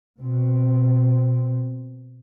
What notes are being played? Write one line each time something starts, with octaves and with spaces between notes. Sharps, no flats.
B2 C4